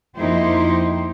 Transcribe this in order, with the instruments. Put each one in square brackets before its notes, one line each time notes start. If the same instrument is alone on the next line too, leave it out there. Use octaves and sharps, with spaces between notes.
[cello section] F2 A#3 D#4 E4 G4 C5